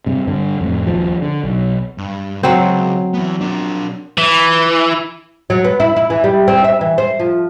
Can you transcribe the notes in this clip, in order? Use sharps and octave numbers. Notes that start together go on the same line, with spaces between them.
G2 C3
G2 D3
F2 A2
D#1 A#1 F3
D3
B1
G2
C#2 F#3 C4
E3 B3
D4 A#4
E3
F#3
B3
E4
E4
E3
G3
C4
E5
E3
C5
F3